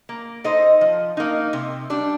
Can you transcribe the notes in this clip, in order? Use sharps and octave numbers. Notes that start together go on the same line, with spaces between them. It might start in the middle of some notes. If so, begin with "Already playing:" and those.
A#3
D#4 A4 C5 D#5
F3
A#3 D#4
C3
G3 D4